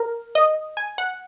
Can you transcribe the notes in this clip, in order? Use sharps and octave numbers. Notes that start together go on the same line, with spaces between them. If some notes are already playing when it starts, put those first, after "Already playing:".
Already playing: A#4
D#5
G#5
F#5